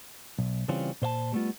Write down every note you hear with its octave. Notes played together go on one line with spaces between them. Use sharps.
B1
C#3 E3 G3 C4 C#4 F4
A#2 C5 F5 A5
G3 A3 B3 F4